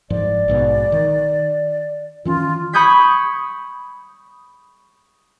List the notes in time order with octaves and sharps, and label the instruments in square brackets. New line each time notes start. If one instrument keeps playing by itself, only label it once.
[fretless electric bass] F#1 G#2 F3 [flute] D5
[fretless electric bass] A#1 G#2 B2
D#3
[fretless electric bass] D#3 E3 C#4 [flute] F4
[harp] B5 C#6 D#6 G6 G#6 B6